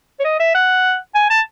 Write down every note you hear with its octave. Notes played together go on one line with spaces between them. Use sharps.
C#5
D#5
E5
F#5
G#5
A5